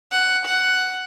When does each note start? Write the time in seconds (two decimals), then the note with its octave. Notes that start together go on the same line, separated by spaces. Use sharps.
0.11 F#5
0.45 F#5